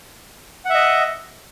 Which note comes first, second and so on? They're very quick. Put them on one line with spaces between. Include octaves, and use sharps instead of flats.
F#5 E5 D#5